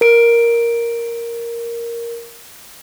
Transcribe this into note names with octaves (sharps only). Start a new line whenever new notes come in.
A#4 D7